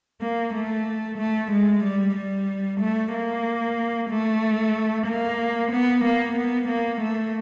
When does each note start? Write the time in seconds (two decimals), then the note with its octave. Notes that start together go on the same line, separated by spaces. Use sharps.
0.21 A#3
0.53 A3
1.18 A3
1.51 G#3
1.83 G3
2.16 G3
2.80 A3
3.13 A#3
4.10 A3
5.06 A#3
5.71 B3
6.03 A#3
6.36 B3
6.68 A#3
7.00 A3